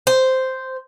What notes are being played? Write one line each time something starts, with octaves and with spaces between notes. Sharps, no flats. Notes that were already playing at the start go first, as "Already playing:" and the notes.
C5